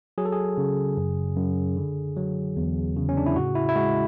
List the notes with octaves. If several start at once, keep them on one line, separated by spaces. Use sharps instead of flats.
F#3 G#4
A4
G#4
C#3
F#2
F#2
D3
F#3
E2
C#3
C#4
D4
E4
A2 F#4
E4
E4
G#3 F#4